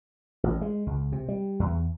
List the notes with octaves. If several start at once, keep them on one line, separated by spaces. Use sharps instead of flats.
A1
G#3
C#2
C3
G3
E2